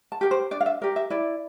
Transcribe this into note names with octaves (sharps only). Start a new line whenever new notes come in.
A5
G4 A#4
C5
D4 D5
F5
E5
G4 A#4 D5
E5
E4 D5